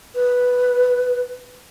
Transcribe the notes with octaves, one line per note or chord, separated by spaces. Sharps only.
B4